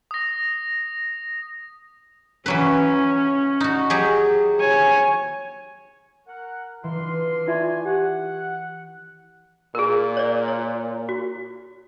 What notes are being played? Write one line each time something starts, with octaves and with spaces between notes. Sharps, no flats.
D#6 A#6
E3 F#3 C#4 B4
D#4 F#4
F#3 G4 G#4
C#5 G#5
A#4 F#5
D3 E3 F4 C6
A3 E4 F4 D5 E5 G#5
G4 F#5
A#2 G#4 A#4
C#5 D5
C#5
F#4